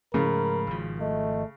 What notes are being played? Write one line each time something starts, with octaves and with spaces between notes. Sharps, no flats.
G#2 C#3 F3 A3 A#4 B5
G#1 F3
A3 D#5